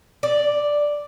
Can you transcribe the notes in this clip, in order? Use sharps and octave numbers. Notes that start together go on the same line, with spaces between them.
D5